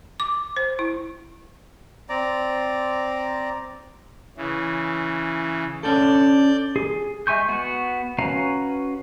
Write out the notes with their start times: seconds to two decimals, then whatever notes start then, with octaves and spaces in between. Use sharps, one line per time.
0.20 D6
0.57 C5
0.79 E4
2.09 C4 D5 A#5
4.37 C#3 E3
5.83 C#4 D4 A4 D5 G6
6.76 G#4
7.27 G#3 E5 G#5 C#6 G6
7.48 B3 F#4
8.18 C#4 F#4 B4 F5 A#5